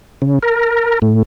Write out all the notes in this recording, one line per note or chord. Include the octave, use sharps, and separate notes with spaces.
C#3
A#4
A2